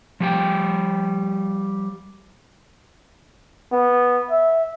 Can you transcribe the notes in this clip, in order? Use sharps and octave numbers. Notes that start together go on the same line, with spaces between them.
F3 G3 G5
B3
E5